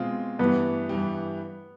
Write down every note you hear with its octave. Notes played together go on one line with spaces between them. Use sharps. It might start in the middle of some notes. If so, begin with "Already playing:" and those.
Already playing: B2 G#3 C4 F4
G2 E3 G3 B3
G2 E3 G3